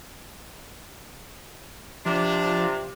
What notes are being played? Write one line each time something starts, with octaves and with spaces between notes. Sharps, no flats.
C3 F3 D4